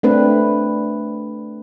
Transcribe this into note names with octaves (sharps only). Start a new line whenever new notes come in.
A3 C4 D4 B4